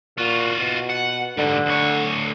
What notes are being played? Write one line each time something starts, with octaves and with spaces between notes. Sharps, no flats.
A#2 F4 F#4
B2
F#5
G#2 D3 G3
D2 C#5